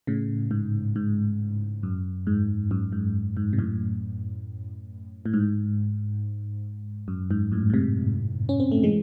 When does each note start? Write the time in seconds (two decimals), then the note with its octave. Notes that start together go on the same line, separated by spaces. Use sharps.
0.07 A2 C#3
0.51 G#2
0.96 G#2
1.83 F#2
2.27 G#2
2.71 F#2
2.92 G#2
3.37 G#2
3.53 C3
3.58 F#2 A2
5.26 A2
5.34 G#2
7.08 F#2
7.31 G#2
7.52 F#2 A2
7.70 A2
7.74 G#2 C3
8.49 C#4
8.60 C4
8.72 A3
8.83 E3 G#3